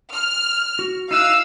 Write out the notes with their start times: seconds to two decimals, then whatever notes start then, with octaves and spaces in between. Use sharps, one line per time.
0.13 F6
0.79 F#4
1.11 D#4 E4 F5 E6 F#6